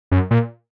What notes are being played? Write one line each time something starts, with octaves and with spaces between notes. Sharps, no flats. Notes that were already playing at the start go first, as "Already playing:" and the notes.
F#2
A#2